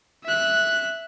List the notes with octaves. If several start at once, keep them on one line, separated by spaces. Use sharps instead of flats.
E5 F#6